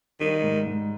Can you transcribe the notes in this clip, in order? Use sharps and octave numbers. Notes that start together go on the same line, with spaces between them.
D#3 G3
G#2
G#2